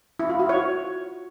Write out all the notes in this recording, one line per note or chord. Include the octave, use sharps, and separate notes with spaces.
E4
F4
F#4
C#5